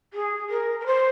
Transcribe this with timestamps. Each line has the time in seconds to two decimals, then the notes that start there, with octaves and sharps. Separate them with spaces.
0.13 G#4
0.49 A#4
0.80 A#4
0.86 C5